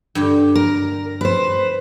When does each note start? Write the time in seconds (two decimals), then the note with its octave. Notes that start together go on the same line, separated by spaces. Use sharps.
0.15 G2 D3 G4
0.55 A#4
1.21 B4 C5